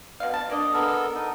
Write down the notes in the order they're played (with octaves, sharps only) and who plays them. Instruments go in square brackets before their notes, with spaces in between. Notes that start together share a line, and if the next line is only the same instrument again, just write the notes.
[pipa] B2 F5
A5
A#3 D4 D#5
[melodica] B3 A4 A#4
D#4